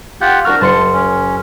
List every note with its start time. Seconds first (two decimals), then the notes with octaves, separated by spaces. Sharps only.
0.21 F4 G4 F#5 G6
0.45 D4 F#4 A#4 F6
0.61 F#1 A5 C6 C#7
0.93 C#4